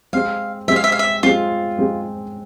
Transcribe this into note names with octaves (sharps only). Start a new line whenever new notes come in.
G#3 C4 G#4 F5
G#3 C4 G#4 E5
F5
E5
F5
E5
G#3 C4 F4 G#4
G#3 C4 G#4